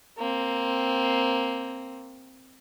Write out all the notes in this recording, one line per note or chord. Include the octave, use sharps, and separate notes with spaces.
A#3 C4